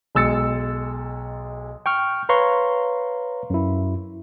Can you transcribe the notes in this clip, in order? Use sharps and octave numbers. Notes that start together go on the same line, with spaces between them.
B1 G#3 E6 A6 C#7
G5 C#6 F6
B4 C#5 F5 A#5 C6 C#6
F#2 E4